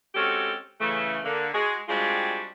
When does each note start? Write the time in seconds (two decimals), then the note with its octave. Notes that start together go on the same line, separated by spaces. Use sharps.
0.15 G#3 C4 C#4 F#4 G4 A4
0.80 C#3 E3 A3
1.24 D3 A#3
1.54 G#3 F#4 G#4
1.89 G3 G#3 C4 D4 F4 F#4